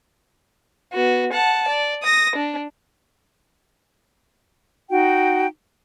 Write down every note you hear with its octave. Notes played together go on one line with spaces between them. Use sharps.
B3 F#4
F#5 A5
D5
D#6 A#6
D4
D#4 F#4 G5